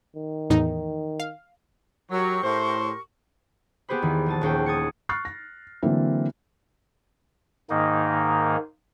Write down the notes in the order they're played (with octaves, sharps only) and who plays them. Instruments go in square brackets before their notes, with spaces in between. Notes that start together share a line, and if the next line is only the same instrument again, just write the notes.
[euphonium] D#3
[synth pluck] E2 A2 D#4
F5
[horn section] F#3 [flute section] G4 A#4 C#6
[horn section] A2 C5
[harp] B3 G4 G#4 C5 B5
E2 D#3
A#1 G#4 A5
D#1 D#2 C#4 G5
D#6 G#6 A6 C#7
[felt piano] C#6 F6 F#6 A6 C7
A#6
D3 E3 F#3 A#3 C4 E4
[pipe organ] G#2 D#3 A#3 D#4